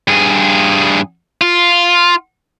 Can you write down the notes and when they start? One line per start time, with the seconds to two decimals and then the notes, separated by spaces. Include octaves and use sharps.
0.08 G2 G#4
1.41 F4